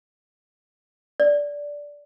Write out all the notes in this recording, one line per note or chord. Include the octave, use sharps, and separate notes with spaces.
D5